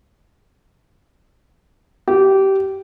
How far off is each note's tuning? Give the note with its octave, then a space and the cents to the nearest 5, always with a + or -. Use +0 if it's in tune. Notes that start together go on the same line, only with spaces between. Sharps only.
G4 -20